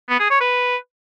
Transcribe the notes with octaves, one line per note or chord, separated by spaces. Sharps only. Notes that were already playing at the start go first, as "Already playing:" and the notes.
B3
G#4
C#5
B4